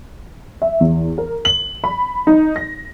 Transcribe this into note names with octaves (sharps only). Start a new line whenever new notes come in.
E5
E2
A#4
F#7
B5
D#4
A#6